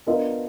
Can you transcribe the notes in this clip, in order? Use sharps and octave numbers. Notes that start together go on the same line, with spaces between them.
B3 D4 F4 A#4 D#5